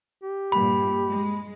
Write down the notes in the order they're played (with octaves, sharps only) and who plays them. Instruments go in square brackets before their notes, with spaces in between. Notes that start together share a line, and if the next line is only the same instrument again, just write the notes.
[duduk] G4
[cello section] G2 A#2 [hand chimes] B5
[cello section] G#3